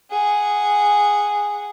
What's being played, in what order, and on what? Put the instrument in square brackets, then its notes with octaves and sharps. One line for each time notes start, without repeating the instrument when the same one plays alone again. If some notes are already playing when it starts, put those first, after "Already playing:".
[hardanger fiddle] G#4 F#5